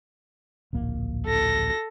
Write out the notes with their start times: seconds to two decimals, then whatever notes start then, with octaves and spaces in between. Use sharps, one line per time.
0.73 D1 A#1 A#3
1.27 A4 A#6